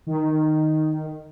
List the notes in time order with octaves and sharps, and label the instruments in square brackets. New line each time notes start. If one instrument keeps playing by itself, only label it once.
[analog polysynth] D#3